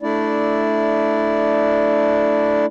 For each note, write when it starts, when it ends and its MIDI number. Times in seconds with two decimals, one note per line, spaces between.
0.02 2.66 57
0.02 2.66 62
0.02 2.66 64
0.02 2.66 74